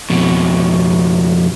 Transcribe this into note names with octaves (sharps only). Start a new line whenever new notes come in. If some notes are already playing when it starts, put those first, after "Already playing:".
F2 B2